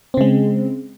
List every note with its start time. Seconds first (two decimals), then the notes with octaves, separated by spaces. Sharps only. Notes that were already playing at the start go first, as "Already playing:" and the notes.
0.14 C4
0.17 C#3
0.21 G#3